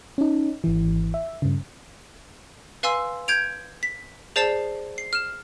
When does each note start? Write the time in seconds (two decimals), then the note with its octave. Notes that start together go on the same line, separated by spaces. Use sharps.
0.18 C#4 D#4
0.64 G#1 E3
1.14 E5
1.42 G2 C#3
2.83 B4 F5 G#5 C6 E6
3.28 G6 G#6 D7 F7
3.83 B6
4.36 G#4 C5 D5 A5 C7 E7
4.98 C7
5.13 F6 E7